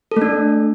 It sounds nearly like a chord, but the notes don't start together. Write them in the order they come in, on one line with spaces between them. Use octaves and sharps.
A4 A3 D4